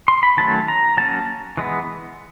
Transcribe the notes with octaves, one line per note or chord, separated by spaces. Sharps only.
C6
B5
D#3 F#3 A3 C#4 A5
A#5
F#3 A#3 C#4 A5
E3 G#3 B3